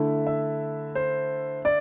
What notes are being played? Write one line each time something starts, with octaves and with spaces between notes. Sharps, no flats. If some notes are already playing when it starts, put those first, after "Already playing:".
Already playing: D3 A3 E4
E5
C5
D5